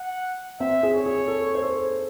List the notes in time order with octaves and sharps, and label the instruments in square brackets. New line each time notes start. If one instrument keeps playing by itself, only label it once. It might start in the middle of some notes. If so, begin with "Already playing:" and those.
Already playing: [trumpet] F#5
[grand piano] C4 [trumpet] E5
[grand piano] G#4
[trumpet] C#5
[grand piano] G#4
A4
C5
A4